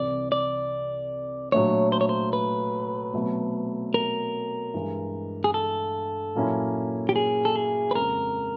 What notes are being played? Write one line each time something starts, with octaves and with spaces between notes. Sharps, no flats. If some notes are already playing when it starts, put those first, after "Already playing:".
Already playing: C2 C3 E3 D5
D5
A#2 F#3 A3 D4 C#5
C5
C#5
C5
B4
B2 F#3 A3 C4
A#4
G2 E3 G#3
G#4
A4
A#2 F#3 A#3 C#4 E4
G4
G#4
A4
G#4
B4
F2 C#3 F3 G#3 A#4